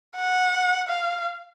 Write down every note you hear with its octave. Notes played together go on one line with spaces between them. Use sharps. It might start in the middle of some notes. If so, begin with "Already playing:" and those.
F#5
F5